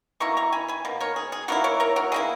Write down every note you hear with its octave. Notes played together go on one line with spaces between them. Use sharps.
B2 A#3 E4 A#5 C#6
A#5 C#6
G#5 B5
G#5 B5
B2 A#3
A#4 C#5
G#4
G#4
B2 A#3 E4 F#4 A#4
A#4 C#5
A#4 C#5
F#4 A#4
B2 A#3 E4 G#4